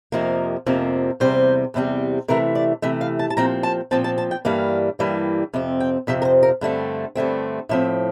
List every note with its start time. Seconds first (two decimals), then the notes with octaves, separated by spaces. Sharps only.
0.12 F2 C3 F3 A#3 A#4
0.66 F2 C3 F3 A#3
1.20 E2 C3 G3 C4 C5
1.74 E2 C3 G3 C4
2.28 C3 E3 A3 A#4
2.55 D5
2.82 C3 E3 A3 E5
3.01 F5
3.19 A5
3.30 A5
3.37 A#2 F3 C4 A#5
3.63 A5
3.91 A#2 F3 C4 A5
4.04 A5
4.18 A5
4.31 G5
4.45 G2 E3 G3 A#3 F5
4.99 G2 E3 G3 A#3
5.53 F2 C3 C4
5.80 G5
6.07 F2 C3 F3 C4 E5
6.22 A#4
6.25 C5
6.43 A#4
6.61 G2 D3 A3 C4
7.15 G2 D3 A3 C4
7.69 A2 F3 C4 E5